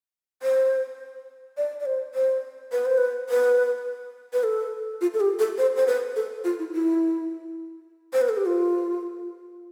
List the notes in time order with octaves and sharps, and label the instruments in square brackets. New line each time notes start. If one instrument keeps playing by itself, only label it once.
[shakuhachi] C5
D5
D5
C5
C5
B4
C5
B4
B4
B4
A4
F4
A4
G4
A4
C5
C5
B4
A4
F4
E4
E4
C5
B4
A4
G4
F4